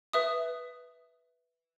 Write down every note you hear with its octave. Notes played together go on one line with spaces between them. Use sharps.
B4 E5 D#6